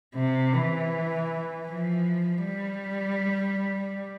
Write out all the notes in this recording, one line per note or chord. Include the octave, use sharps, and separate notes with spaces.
C3
E3
F3
G3